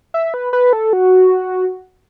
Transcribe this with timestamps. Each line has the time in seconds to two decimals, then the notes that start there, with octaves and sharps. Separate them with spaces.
0.14 E5
0.34 B4
0.53 B4
0.73 A4
0.93 F#4